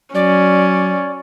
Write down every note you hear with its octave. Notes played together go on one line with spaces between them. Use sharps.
F#3 C#4 D5